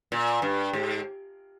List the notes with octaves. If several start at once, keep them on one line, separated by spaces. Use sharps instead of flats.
A#2
G2
G#2